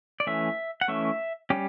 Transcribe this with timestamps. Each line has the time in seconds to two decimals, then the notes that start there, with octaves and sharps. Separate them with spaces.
0.20 D5
0.27 E3 A3 C#4 E5
0.81 F#5
0.88 E3 A3 C#4 E5
1.50 G3 C#4 G4